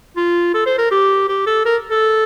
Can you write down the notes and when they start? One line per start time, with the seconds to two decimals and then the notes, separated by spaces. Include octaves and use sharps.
0.16 F4
0.54 A4
0.66 C5
0.78 A#4
0.91 G4
1.28 G4
1.47 A4
1.65 A#4
1.90 A4